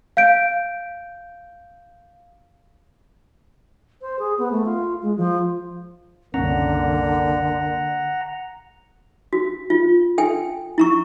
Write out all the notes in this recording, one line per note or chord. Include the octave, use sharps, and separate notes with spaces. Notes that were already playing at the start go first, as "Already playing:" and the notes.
F5 G6 D7
C5
G#4
B3
A3
F4
G#3
F3
F#1 C2 D3 A#3 C#4 F#5 A#5
F#4
F4
A4 G5 G#5
E4 A#5 C#6